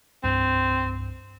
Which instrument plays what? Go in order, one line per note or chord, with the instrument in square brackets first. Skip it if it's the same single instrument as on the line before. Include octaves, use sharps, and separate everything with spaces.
[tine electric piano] C2 G2 [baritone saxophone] C4